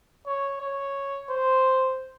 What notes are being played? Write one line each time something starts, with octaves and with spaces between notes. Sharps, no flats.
C#5
C#5
C5